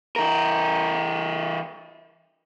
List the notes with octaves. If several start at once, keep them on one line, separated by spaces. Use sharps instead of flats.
E3 A#4